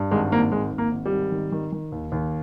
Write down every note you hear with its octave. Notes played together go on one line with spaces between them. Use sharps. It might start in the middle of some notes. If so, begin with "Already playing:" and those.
Already playing: G2
G#1 G#3
G#1 A#3
G#1 G#3
G#1
A#3
G#1
G3
G#1
D#3
D#3
D#3
D#2
D#2